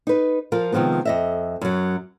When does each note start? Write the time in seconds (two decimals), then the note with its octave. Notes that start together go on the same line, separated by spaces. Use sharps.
0.07 D#4 B4
0.52 F3 F4 A#4
0.72 C3 D#3 F3 G#3 B3
1.05 F2 D#5 E5
1.61 F#2 F#3